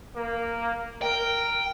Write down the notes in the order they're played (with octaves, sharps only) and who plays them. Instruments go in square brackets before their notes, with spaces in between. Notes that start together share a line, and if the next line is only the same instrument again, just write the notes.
[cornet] A#3
[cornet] A#4 [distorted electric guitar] G5